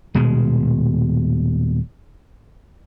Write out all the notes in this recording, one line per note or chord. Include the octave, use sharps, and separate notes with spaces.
D#1 B2 G#3